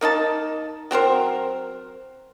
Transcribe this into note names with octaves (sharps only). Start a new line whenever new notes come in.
A#3 D#4 D#5 A5
F#3 C4 A#4 C5